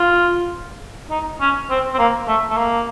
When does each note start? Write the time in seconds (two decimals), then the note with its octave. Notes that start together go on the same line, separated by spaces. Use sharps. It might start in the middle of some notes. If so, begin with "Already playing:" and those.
Already playing: F4
1.10 D#4
1.40 C#4
1.70 C4
1.94 C4
1.99 A#3
2.28 A3
2.50 A3
2.57 A#3